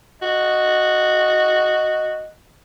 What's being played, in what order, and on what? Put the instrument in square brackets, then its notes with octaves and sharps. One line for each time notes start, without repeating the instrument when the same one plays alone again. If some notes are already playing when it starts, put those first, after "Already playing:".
[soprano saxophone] F#4 [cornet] D#5